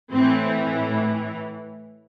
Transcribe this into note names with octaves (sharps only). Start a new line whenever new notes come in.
A2 E3 C4